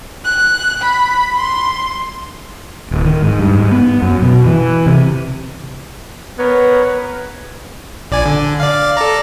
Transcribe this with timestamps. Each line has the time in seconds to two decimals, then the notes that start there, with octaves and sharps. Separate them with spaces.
0.25 F#6
0.82 B5
1.39 C6
2.91 D1
3.05 D#3
3.22 G#2
3.39 G2
3.55 G#2
3.72 B3
4.02 F#2
4.22 B2
4.46 E3
4.86 C3
6.38 B3 A#4 B4 C#5
8.11 A#1 D5 G#5
8.25 D3
8.60 D5 F5
8.97 A4 D5 A#5